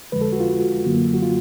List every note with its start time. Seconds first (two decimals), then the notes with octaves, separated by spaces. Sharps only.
0.12 F2 D3 F3 G#3 B4
0.21 A4
0.33 F#4
0.40 F4
0.86 F#2 D3 F#3 A#3
1.14 F#4
1.22 F4